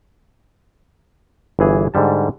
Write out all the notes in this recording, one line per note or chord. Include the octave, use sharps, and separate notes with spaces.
G1 E3 G#4
G#2 D3 G3 A5